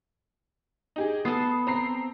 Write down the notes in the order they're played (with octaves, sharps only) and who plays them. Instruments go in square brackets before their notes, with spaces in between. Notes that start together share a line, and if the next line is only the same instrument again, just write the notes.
[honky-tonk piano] D#4 G4 G#4
[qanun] B3 A4 [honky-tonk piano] D#6 C7
[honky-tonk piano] C4 A#5 C7